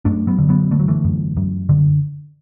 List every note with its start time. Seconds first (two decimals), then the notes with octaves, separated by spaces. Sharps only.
0.05 F#2 A3 D4
0.27 F#3 B3
0.38 D3
0.49 F#3 B3
0.71 D3 A3
0.79 F#3
0.88 E3 A3
1.04 F#2
1.37 F#2
1.69 D3